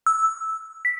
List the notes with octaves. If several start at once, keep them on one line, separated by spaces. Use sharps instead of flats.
E6
B6